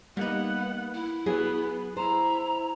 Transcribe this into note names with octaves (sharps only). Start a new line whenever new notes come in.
G3 A#3 B3 D#4 F#5
E4
F#3 B3 G#4
E4 C5 A#5